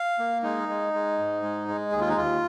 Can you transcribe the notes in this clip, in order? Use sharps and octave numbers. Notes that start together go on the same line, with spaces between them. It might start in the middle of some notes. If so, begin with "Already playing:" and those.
Already playing: F5
A#3
G#3 D#4
G#3
G#3
G#2
G#3
G#3
D#2 G#4
F4
D#4
D#2 F4